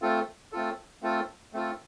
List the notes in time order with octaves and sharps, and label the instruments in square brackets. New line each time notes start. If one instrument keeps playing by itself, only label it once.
[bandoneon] A3 C4 F4 A4
A3 C4 F4 A4
A3 C4 F4 A4
A3 C4 F4 A4